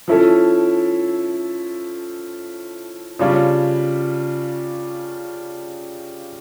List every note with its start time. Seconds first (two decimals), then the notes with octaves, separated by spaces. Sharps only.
0.08 F3 C#4 E4 A4 C#5
3.19 C#3 G3 D4 F4 C#5